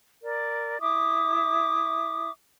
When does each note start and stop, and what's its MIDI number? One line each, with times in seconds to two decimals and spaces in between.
0.23 0.79 70
0.23 0.79 74
0.81 2.30 64
0.81 2.30 76
0.81 2.30 86
0.81 2.30 87